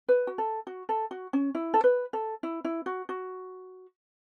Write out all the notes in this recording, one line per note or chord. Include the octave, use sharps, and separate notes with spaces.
B4
F#4
A4
F#4
A4
F#4
C#4
E4
A4
B4
A4
E4
E4
F#4
F#4